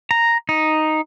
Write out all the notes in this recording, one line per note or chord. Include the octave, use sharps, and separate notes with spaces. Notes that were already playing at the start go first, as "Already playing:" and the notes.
A#5
D#4